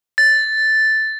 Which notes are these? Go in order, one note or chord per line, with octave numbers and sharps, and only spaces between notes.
A6